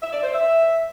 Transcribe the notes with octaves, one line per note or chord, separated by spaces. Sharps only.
E5
D5
C5
E5